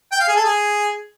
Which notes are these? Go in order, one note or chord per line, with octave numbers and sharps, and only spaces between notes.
G5
F5
G#4
A4
G#4